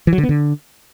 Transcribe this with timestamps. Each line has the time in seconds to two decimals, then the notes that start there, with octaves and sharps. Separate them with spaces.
0.07 E3
0.13 F#3
0.18 D3
0.23 B3
0.29 D3